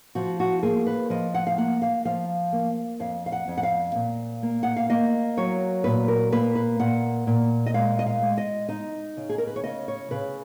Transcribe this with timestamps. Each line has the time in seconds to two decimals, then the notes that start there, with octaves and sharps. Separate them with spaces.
0.15 F3 F#4
0.40 F#4
0.63 A#3 G#4
0.87 B4
1.10 F3 D#5
1.34 F#5
1.47 F5
1.58 A#3 F#5
1.82 F5
2.05 F3 F5
2.52 A#3
3.00 F2 F5
3.26 F5
3.32 F#5
3.48 F2
3.57 F#5
3.63 F5
3.95 A#2
4.43 A#3
4.63 F#5
4.76 F5
4.90 A#3 D#5
5.37 F#3 C#5
5.84 A#2 B4
6.08 A#4
6.32 A#3 B4
6.55 B4
6.79 A#2 F#5
7.27 A#2
7.66 D#5
7.74 G#3 F5
7.99 D#5
8.06 F5
8.22 G#3
8.38 D#5
8.69 D#4 D#5
9.17 C#3
9.29 G#4
9.38 A#4
9.47 B4
9.56 C#5
9.64 C#3 D#5
9.88 C#5
10.11 C#3 B4